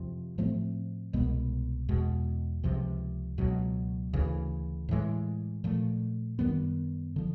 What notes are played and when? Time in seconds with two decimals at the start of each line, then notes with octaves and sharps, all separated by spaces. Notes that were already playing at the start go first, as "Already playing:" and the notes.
Already playing: F2 C3 F3
0.38 A2 F3 A3 C4
1.13 C2 B2 G#3 B3
1.89 E2 B2 G#3
2.64 C#2 C3 F3
3.38 C#2 B2 F#3
4.13 D2 C#3 E3
4.89 A2 E3 G#3
5.64 A#2 F3 A3
6.39 F#2 D#3 G3 B3
7.16 D3 F3